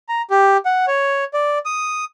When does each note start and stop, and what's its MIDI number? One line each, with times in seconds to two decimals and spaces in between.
0.09 0.22 82
0.30 0.57 67
0.65 0.85 78
0.87 1.24 73
1.34 1.58 74
1.65 2.05 87